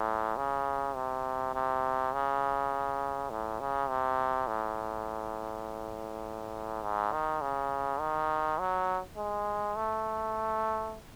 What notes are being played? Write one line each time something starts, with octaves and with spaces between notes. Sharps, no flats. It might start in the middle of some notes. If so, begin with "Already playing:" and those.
Already playing: A2
C#3
C3
C3
C#3
A2
C#3
C3
A2
G#2
D#3
C#3
D#3
F#3
G#3
A3